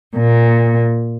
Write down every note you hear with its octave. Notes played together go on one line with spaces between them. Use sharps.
A#2